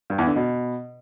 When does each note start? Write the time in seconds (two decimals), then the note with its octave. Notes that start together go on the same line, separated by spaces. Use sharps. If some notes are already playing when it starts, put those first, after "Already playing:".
0.10 G2
0.19 E2
0.27 D3
0.36 B2